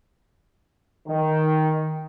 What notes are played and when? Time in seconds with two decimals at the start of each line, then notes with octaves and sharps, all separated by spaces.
1.07 D#3